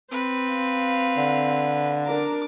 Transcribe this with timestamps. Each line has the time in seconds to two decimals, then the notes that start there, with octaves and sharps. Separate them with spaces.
0.11 C4 B4
0.51 F5
1.17 D3
2.06 D4 A#4 D6